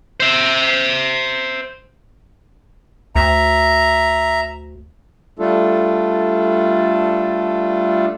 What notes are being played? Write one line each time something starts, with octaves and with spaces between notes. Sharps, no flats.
C5 E5
D2 E5 A#5
G3 A3 D4 F4 A4